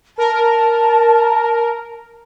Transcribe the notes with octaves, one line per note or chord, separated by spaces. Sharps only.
A#4 A5